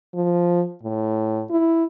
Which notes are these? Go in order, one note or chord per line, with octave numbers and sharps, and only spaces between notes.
F3
A2
E4